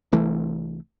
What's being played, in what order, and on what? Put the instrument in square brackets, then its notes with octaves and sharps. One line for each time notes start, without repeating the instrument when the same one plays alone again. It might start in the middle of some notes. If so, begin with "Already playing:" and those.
[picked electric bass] C2 E3 A3